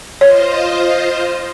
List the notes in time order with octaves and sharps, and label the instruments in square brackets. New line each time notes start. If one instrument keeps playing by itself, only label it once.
[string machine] F4 C5 D#5 [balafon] C#5